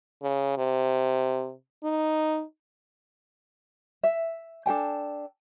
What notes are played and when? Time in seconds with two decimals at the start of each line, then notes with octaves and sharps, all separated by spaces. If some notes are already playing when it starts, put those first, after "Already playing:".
0.22 C#3
0.57 C3
1.84 D#4
4.04 E5
4.66 D4 A4 G5 G#5